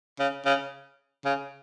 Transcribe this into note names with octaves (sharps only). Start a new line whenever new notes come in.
C#3
C#3
C#3